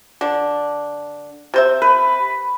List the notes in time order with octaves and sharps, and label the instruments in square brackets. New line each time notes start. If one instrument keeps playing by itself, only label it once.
[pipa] D3 D4
C3 C5 E5
[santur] B4